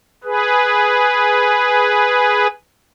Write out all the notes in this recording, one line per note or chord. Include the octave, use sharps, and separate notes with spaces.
G#4 B4